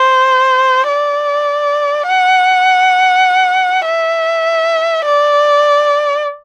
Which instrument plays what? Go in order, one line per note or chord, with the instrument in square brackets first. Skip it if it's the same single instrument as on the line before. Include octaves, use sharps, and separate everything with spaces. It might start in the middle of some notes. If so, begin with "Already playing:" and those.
Already playing: [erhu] C5
D5
F#5
E5
D5